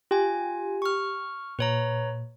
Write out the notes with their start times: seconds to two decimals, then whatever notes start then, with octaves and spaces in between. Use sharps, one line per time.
0.11 F4 G4 G#5
0.82 C#6 F6
1.59 A#2 B4 C#5 A#5